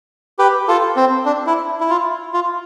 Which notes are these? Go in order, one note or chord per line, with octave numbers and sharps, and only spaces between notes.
G4 B4
F4 A4
C4
D4
E4
E4
F4
F4